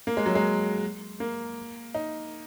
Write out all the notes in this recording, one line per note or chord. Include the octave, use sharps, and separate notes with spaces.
A#3
G#3
F#3
G#3
A#3
D#4